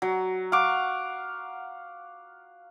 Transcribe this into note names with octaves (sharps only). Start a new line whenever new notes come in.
F#3
F5 F#5 C#6 D6